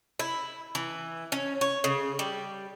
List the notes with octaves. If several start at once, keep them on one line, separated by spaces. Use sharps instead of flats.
E4
E3
C#4
C#5
C#3
G3